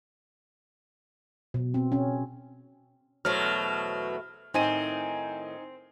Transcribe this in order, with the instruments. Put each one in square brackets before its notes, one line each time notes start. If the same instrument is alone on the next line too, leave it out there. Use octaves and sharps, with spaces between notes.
[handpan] B2
C4
C#4
[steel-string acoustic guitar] E2 A3 C5 [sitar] B2 F#3 [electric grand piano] F6
[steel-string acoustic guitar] A2 D#3 [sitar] C4 [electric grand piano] D#4 G#5 D#7